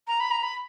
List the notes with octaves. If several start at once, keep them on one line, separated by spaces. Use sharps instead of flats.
A#5
B5
A#5
B5